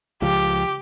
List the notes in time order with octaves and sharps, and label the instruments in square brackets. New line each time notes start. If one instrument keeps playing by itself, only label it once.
[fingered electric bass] C#2 F3 [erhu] G4